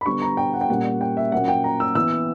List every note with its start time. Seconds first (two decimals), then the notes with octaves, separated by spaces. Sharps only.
0.01 B5
0.06 D3 G3 B3 C#6
0.22 A#5
0.37 G5
0.54 F#5
0.61 G5
0.68 A#2 G3 A#3 C#4 F#5
1.01 G5
1.17 E5
1.32 A#2 F#3 A#3 C#4 F#5
1.48 G5
1.64 A#5
1.80 E6
1.95 E3 B3 E6